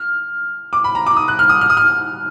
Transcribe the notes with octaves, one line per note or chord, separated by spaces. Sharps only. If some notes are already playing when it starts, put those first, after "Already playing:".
Already playing: F6
D6
B5
A#5
D6
D#6
F#6
F6
D#6
F6
D#6
F6